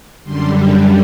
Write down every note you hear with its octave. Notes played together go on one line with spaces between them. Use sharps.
F#2 D3 G3 C6